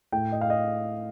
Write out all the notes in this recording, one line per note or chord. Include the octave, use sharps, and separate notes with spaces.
A2 G5
D#5
F5
D#5